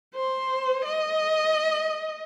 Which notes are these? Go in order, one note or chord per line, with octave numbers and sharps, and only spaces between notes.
C5
D#5